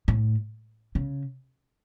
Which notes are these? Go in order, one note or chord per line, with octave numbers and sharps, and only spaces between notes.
A2
C#3